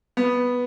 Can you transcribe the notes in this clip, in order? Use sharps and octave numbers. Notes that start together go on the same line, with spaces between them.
B3